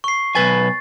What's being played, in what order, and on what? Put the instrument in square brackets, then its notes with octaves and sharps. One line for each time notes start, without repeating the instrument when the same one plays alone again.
[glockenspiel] C#6 C7
[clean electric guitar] B1 B4 G#5 [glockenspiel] A6